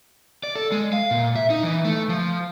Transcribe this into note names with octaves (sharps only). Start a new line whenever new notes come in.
D5
A4
G#3
F5
A#2
E5
D#4
E3
A3
F3